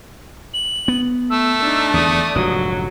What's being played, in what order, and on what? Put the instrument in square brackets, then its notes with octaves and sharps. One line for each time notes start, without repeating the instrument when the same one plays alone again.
[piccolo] F#7
[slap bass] B3
[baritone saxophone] A3 [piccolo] E6
[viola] D4 D#4
[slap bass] E2 D3 [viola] D5 [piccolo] D#6
[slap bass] F1 G#2 D3 [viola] F#3